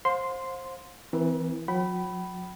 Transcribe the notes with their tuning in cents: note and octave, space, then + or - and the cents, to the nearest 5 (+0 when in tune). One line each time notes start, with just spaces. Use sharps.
C5 +20 F5 +40 C6 -10
E3 +0 C4 -30 A#4 +45
F#3 -40 G5 -45 B5 +0